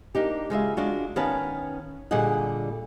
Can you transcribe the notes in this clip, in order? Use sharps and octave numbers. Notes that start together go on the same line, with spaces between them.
A#3 D4 D#4 G4
C#3 G#3 F4 E5
G#3 D4 F4 F#4
D#3 B3 C#4 B4 F5 A5
A#2 D3 G3 G#4 D#5 F#5